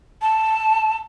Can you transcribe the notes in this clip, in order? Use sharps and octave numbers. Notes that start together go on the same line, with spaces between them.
A5